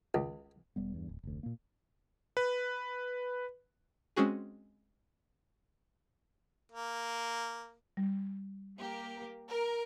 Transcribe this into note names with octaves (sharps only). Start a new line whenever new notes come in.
C#2
E1 G3 B3
E2 G2
D1
F1 D2
A#2 A#3
B4
G#3 C4 C#4 F#4 G#4
A#3
G3
A#3 G4 A#4
A#4